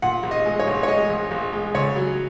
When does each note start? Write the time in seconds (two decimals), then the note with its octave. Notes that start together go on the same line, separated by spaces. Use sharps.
0.02 A#2 F#5
0.23 A#1
0.31 D#5
0.46 G#3
0.59 C#5
0.67 A#1
0.83 C#5
0.88 G#3 D#5
1.10 A#1
1.31 A#1
1.53 G#3
1.74 C#2 C#5
1.96 F#3